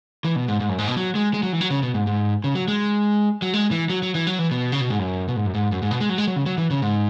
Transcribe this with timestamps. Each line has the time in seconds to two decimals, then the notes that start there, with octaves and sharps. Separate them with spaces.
0.24 E3
0.36 B2
0.48 G#2
0.60 G#2
0.69 F#2
0.78 G#2
0.88 B2
0.97 F#3
1.15 G#3
1.34 G#3
1.43 F#3
1.53 E3
1.61 F#3
1.70 C#3
1.83 B2
1.94 G#2
2.07 G#2
2.44 C#3
2.55 F#3
2.68 G#3
3.42 F#3
3.54 G#3
3.71 E3
3.90 F#3
4.03 F#3
4.15 E3
4.27 F#3
4.39 E3
4.51 B2
4.72 C#3
4.81 B2
4.90 G#2
4.99 F#2
5.28 B2
5.36 G#2
5.46 F#2
5.55 G#2
5.72 F#2
5.83 G#2
5.91 B2
6.00 G#3
6.09 F#3
6.18 G#3
6.27 F#3
6.36 C#3
6.46 F#3
6.58 E3
6.71 C#3
6.82 G#2